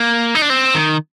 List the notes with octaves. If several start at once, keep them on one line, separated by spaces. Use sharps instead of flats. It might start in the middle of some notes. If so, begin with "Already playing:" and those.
Already playing: A#3
D#4
D4
C4
D#3